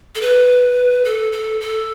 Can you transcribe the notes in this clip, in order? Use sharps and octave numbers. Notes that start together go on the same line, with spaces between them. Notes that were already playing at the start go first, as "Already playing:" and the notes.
A4
B4
A4
A4
A4